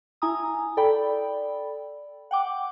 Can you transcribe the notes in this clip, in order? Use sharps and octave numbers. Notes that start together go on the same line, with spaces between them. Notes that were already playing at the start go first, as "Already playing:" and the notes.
E4 G#5 A#5 D#6
A4 D5 G5 B5
F#5 G5 D6